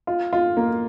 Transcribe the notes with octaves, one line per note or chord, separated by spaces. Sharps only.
F4
F4
A#3